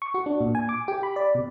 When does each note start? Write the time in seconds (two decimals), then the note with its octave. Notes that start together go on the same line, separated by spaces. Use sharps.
0.02 C#6
0.14 F#4
0.26 D4
0.41 A#2
0.55 G#5
0.69 D6
0.88 G4
1.03 B5
1.16 D5
1.35 B2